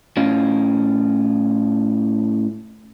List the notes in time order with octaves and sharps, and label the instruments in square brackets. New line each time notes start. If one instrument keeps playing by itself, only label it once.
[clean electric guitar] A2 C#4 F4